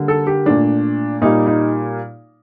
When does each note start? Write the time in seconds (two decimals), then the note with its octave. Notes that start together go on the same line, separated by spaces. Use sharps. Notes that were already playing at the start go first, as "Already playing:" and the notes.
Already playing: D3 G3 A#3
0.08 A4
0.27 G4
0.46 A#2 A3 D4
1.22 A#2 G3 A#3 D#4
1.47 D#4